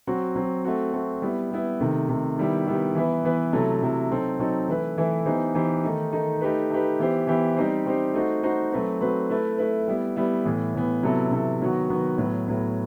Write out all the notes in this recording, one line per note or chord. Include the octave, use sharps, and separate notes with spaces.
F#3 C4 F#4
F#3 C4 F#4
A3 C4 F#4
A3 C4 F#4
G3 B3 E4
G3 B3 E4
C3 D#3 A3
C3 D#3 A3
D#3 G3 B3 E4 G4
D#3 G3 B3 E4 G4
E3 B3 E4 B4
E3 B3 E4 B4
C3 F#3 A3 E4 A4
C3 F#3 A3 E4 A4
F#3 C4 D#4 A4
F#3 C4 D#4 A4
E3 A3 E4 B4
E3 A3 E4 B4
E3 B3 D#4 G4 C5
E3 B3 D#4 G4 C5
D#3 A3 D#4
D#3 A3 D#4
A3 D#4 G4 B4
A3 D#4 G4 B4
E3 B3 E4 G4 C5
E3 B3 E4 G4 C5
G3 C4 D#4 G4 C5
G3 C4 D#4 G4 C5
A3 D#4 F#4 C5
A3 D#4 F#4 C5
F#3 A3 C4 F#4 B4
F#3 A3 C4 F#4 B4
A3 E4 B4
A3 E4 B4
G3 B3 E4
G3 B3 E4
A2 E3 B3
A2 E3 B3
C3 F#3 B3 E4 A4
C3 F#3 B3 E4 A4
D#3 F#3 B3 F#4
D#3 F#3 B3 F#4
A2 F#3 B3
A2 F#3 B3